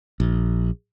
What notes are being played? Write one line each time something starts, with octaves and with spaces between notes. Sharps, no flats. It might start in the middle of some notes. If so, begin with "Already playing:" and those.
A#1